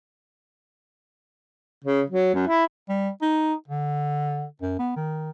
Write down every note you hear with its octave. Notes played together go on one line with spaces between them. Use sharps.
C#3
F#3
F#2
E4
G3
D#4
D3
F#2
B3
D#3